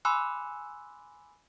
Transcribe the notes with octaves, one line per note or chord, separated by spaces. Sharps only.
G#5 B5 C6 D6 E6 F#6